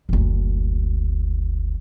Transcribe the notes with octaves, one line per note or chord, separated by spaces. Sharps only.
F#1 D2